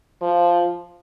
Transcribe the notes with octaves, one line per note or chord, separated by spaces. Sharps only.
F3